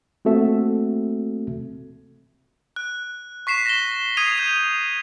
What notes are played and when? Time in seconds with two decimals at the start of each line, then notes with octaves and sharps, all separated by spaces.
0.25 A3 A#3 C4 F#4 A4 E5
2.76 F#6
3.47 C#6 B6 C7 E7
3.66 A#6 G7
4.17 D#6 G#6 C7 D#7 F7
4.38 G6 F7